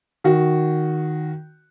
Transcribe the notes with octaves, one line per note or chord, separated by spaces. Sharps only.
D#3 F#4